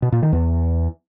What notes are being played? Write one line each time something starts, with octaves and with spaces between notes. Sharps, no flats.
B2
A#2
D#3
E2